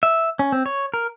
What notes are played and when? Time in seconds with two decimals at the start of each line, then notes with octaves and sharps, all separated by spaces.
0.03 E5
0.39 C#4
0.52 C4
0.66 C#5
0.94 A#4